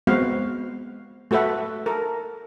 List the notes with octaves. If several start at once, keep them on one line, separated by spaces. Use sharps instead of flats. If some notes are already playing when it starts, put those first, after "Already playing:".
G#3 B3 C4 F#4 B4 F5
A3 F#4 A4 B4 E5 F#5
A4 A#4